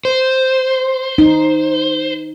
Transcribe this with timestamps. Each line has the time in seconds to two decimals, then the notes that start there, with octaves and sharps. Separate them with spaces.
0.05 C5
1.18 D#4